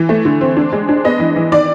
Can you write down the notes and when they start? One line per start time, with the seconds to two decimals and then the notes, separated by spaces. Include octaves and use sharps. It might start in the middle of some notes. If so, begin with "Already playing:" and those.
Already playing: E3
0.09 A3
0.25 D3
0.41 C4
0.57 D4
0.73 G#3
0.89 D4
1.04 B3 D#5
1.20 E3
1.36 E3
1.52 D#3 D5